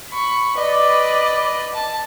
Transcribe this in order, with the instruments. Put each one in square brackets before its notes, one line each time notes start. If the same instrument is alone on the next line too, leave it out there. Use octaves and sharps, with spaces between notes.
[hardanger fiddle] B5 C#6
[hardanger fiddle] B4 D#5 [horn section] D5
[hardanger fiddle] A5